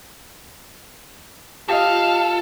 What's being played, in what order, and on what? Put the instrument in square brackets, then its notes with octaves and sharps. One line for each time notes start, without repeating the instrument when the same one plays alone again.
[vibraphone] F4 [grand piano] G4 D#5 [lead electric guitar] A4 [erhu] F5